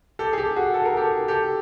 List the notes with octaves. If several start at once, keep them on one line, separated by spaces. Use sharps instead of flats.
G4 A4
G#4
G4 A4
F#4 G#4
A4
A#4
G4 A4
G4 A4